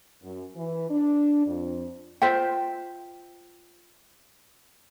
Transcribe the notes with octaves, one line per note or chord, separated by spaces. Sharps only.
F#2
E3
D4
F2
F4 C5 E5 G5